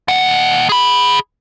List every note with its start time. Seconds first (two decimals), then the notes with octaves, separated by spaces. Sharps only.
0.08 D#2 F#5
0.69 G#4 B5